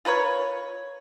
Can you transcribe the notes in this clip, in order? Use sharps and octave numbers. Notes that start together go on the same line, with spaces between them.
F4 A#4 B4 C#5